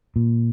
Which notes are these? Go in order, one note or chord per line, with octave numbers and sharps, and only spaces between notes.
A#2